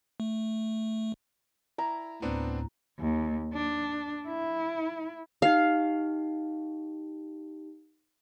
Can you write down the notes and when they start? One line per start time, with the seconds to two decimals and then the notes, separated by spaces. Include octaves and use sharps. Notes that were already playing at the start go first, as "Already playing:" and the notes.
0.20 A3
1.78 E4 A#5
2.22 D2 A2 B3 C4 D4
2.99 D#2
3.53 D4
4.27 E4
5.42 D#4 G4 F5